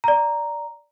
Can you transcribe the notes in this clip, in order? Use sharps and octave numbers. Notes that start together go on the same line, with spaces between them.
D5 A#5